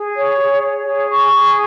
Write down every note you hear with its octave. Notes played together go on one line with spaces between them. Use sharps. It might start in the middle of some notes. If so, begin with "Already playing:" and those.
Already playing: G#4
C#5
G#4
C#5
G#4
C#6
G#4